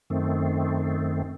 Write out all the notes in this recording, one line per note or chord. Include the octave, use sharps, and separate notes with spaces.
F#2 D#3 A3 C4